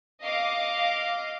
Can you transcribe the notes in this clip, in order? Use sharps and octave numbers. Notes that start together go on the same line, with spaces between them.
D#5 F5 D6